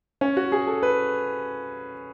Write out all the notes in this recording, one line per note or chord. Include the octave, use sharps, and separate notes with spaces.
C#4
F#4
G#4
A4
B4